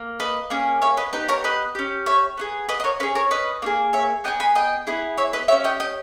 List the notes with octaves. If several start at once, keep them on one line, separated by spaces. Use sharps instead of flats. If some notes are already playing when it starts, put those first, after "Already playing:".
Already playing: A#3
B4 D#5
A#3 C#4 G#4
C#5 E5
B4 D#5
B3 D#4 G4 B4
A#4 C#5
B4 D#5
C#4 G4
C#5 E5
B3 D#4 G#4
B4 D#5
D#5
A#4 C#5
C#4 G#4 B4
A#4 C#5
B4 D#5
A#3 D#4 G#4
C#5 E5
B3 D#4 G#4 D#5 G5
G#5 B5
D#5 G5
B3 E4 G#4
C#5 E5
B4 D#5
C#4 G4 C#5 E5
D#5 G5
D#5 G5